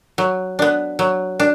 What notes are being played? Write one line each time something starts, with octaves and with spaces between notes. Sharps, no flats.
F#3
B3 D4
F#3
D4